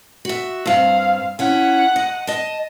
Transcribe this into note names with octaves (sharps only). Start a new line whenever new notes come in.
F#4 E5
G2 C4 F5
C#4 E4 F#5
D#5
D#5 A5